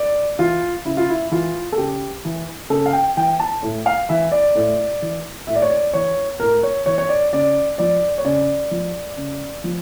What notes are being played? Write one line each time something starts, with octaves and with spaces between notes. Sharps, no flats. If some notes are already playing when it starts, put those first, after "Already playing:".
Already playing: D5
E3 F4
C#3 E4
F4
E4
E3 F4
A4
C#3 G4
E3
C#3 A4
F5
G5
E3 G5
A5
A2
F5
E3 E5
D5
A2
E3
A2 E5
D5
C#5
D5
E3 C#5
A2 A#4
C#5
E3 C#5
C#5
D5
C#3 D5
F3 D5
C#5
C#3 D5
F3
C#3
F3